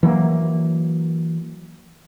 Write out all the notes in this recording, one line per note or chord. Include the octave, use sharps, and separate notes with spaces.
E3 F#3 A3 A#3